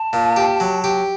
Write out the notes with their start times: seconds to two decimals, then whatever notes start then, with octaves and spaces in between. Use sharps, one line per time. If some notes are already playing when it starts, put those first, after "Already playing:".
Already playing: A5
0.13 A#2
0.36 G4
0.60 F#3
0.84 G4